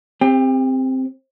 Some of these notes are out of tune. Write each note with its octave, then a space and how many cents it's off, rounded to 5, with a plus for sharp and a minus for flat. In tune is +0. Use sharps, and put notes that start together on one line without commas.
C4 +0 G4 +35